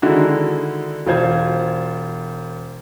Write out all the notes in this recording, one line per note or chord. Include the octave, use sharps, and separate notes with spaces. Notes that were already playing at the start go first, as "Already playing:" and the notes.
D3 D#3 G#3 E4 F#4 G#4
E1 F4 C5 G#6